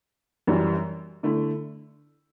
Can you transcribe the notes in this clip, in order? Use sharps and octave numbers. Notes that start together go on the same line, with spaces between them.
F#2 E3 G3
D3 A3 E4